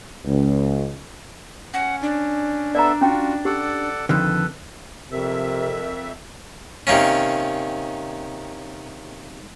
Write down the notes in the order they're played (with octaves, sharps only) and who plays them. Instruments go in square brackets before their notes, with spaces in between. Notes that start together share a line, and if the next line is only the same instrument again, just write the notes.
[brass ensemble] C#2
[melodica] C#4 [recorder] F#5
[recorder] D4
[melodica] B3 A4 E5 [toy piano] D5 A#5
[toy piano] C#4 G5 [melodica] F4 F#4
[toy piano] G4 [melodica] A4 D5 F#5
[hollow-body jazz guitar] F2 D3 D#3 [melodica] A4 B4
[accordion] F2 E5 [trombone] C3 [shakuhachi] A#4
[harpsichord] C3 D#3 A#3 C#4